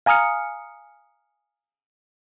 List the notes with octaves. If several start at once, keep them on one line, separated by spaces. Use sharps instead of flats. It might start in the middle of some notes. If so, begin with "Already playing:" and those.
F5 G#5 A#5 D#6 F6 C#7